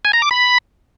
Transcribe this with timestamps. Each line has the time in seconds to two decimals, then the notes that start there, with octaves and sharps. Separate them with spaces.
0.05 G#5
0.13 A#5
0.22 D6
0.31 B5